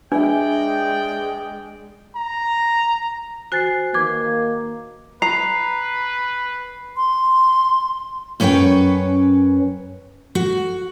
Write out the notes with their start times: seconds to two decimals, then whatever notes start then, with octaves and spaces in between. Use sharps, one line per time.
0.12 G#3 D4 B4 D5 E5 G5
2.16 A#5
3.52 F#4 C5 G#5 F#6 A6 C7
3.94 D#3 A#3 B4 D6 G#6
5.22 B4 A#5 C7
6.97 C6
8.40 F#2 C#4 B4 C#5 G5
10.35 F#4